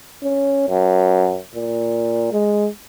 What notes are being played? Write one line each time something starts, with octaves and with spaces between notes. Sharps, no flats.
C#4
F#2
A#2
G#3